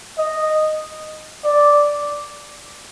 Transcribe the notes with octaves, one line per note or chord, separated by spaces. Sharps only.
D#5
D5